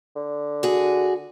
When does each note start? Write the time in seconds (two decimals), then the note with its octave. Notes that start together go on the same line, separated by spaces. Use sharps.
0.16 D3
0.63 F#4 G#4